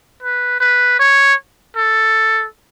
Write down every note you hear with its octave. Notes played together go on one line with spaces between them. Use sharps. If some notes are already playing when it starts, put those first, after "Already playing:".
B4
B4
C#5
A4